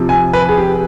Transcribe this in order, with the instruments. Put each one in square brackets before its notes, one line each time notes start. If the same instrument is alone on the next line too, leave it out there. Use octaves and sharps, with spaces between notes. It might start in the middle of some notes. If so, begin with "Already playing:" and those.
Already playing: [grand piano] C3 F3
G#5
B4
G#4
G4